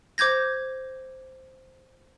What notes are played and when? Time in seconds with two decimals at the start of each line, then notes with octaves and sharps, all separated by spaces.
0.18 C5 D6 G6 G#6 A#6